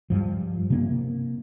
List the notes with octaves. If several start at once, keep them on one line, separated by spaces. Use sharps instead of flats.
G2 F3
C3 A#3 D4